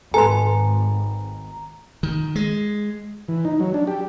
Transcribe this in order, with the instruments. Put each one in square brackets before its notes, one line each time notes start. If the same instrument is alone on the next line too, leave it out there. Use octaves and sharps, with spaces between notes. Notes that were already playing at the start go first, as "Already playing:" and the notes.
[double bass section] G#1 [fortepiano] A4 B4 [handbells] G#5 C6 [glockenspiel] A#5
[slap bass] D#3
G#3
[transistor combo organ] E3
D#4
F#3
D4
G4